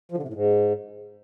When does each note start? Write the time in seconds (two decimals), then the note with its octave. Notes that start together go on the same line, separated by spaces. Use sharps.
0.12 F3
0.17 D3
0.23 C3
0.28 A2
0.34 G#2